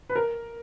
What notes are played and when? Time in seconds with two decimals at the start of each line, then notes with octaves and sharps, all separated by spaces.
0.10 B4
0.16 A#4